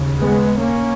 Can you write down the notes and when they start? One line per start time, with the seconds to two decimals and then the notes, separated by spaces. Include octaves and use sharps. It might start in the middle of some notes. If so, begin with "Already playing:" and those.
Already playing: D#2 C#3
0.20 G#3 B3
0.60 A#3 C#4